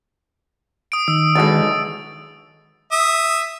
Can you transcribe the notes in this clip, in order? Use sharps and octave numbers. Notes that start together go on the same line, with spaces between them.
D#6 D7
D#3 E6
B1 E2 B2 D3 G#3 A6
E5 D#6